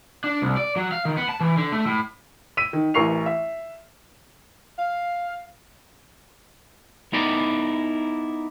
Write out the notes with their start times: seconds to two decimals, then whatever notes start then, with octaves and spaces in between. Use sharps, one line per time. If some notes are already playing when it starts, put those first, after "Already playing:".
0.24 D4
0.42 C2
0.57 D5
0.76 F#3
0.92 F5
1.05 D#3
1.17 B3
1.29 A5
1.40 E3
1.57 D3
1.73 A3
1.87 A2
2.57 E6 B6 D#7
2.73 D#3
2.94 A1 E3 A#4 C#6 C7 F7
3.26 E5
4.79 F5
7.13 B3 D#4 E4 A#4 D5